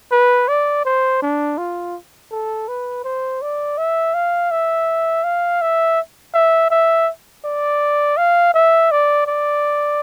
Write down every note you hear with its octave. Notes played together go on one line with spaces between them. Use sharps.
B4
D5
C5
D4
F4
A4
B4
C5
D5
E5
F5
E5
F5
E5
E5
E5
D5
F5
E5
D5
D5